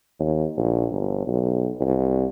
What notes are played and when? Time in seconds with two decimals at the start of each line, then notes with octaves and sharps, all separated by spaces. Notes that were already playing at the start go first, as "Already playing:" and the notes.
0.20 D#2
0.57 A#1
0.91 G1
1.26 B1
1.81 C2